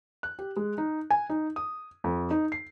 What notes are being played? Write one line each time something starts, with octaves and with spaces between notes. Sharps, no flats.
F#6
G4
G#3
D#4
G#5
D#4
D#6
F2
D#4
C7